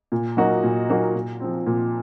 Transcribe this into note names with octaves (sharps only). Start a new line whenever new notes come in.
A#2
F#3 A#3 D#4 F#4
A#2
F#3 A#3 D#4 F#4
A#2
F3 C4
A#2